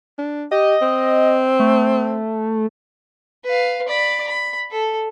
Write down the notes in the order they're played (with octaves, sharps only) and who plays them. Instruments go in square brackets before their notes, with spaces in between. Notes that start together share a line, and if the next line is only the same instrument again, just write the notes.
[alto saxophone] D4
[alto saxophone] G4 [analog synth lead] D#5
[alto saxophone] C4
[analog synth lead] A3
[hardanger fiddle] B4 F5
D5 B5
B5
A4